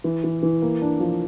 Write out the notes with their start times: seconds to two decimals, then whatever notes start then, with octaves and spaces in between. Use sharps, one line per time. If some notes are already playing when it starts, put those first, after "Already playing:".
0.04 E3
0.24 E3
0.43 E3
0.62 A#3
0.81 D4
1.00 F3